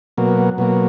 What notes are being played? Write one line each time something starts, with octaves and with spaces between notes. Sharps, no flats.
B2 F#3 A#3
B2 F#3 A#3